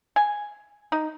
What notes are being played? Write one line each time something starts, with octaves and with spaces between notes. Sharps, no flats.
G#5
D#4